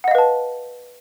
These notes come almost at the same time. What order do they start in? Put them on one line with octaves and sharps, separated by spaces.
F#5 D#5 F5 B4 A5